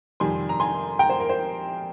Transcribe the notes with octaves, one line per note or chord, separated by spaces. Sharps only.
F2 C3 D#3 G3 G#5 C6
A#5
G#5 C6
G5 A#5
C5
A#4
C5